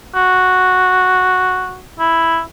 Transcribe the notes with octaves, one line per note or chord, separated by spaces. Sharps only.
F#4
E4